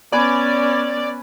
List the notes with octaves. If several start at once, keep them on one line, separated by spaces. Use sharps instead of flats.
B3 C#4 B4 D5 G#5 D6